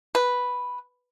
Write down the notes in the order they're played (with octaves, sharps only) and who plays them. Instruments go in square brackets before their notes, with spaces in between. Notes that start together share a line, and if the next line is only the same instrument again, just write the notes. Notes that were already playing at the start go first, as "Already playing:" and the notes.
[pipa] B4